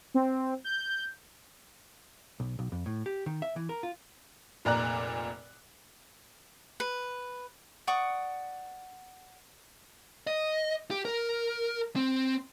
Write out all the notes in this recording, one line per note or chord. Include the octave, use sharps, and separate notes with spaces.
C4
G6
B1
B1
F2
A2
G4
D#3
E5
E3
A#4
F4
F1 A#2 D5 A#5 F#6
B4
D5 F#5 C#6 D#6
D#5
G4
A#4
C4